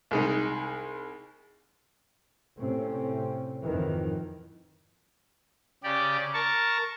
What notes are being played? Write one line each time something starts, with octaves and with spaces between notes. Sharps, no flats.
C2 G#3 D#4
A2 C3 C4 C#4
F2 G#2 D#3 E3
C#3 G4 D5
A#4 A5 C#6